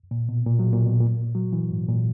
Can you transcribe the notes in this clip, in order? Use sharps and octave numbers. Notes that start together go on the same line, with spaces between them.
A#2
B2
A#2
F#3
A#2
B2
A#2
F#3
E3
G#2
A#2